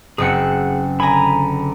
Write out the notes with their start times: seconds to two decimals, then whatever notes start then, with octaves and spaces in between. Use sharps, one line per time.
0.18 F#1 C4 G#4 F#5 C#7
1.00 D3 G#5 A#5 B5